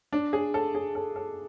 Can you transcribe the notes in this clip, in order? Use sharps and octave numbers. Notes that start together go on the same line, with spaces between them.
D4
G#4
A4
G#4
A4
A4